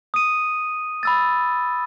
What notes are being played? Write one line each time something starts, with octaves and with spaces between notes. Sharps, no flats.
D#6 D#7
B5 E6 A6